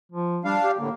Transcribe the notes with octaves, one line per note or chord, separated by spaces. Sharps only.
F3
G3 D4 F5
G4
A2 D3 A#3